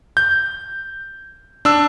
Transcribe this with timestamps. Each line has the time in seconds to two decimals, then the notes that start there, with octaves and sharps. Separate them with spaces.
0.17 G6
1.65 D4 E6